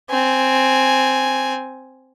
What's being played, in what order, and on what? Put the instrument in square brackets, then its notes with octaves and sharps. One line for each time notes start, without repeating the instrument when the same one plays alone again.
[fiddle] C4 G#5